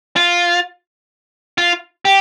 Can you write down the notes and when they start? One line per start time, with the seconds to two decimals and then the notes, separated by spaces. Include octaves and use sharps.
0.16 F4
1.58 F4
2.05 G4